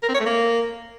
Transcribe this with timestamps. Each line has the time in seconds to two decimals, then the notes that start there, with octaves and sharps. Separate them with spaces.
0.03 A#4
0.09 C4
0.14 C#5
0.20 A3
0.26 A#3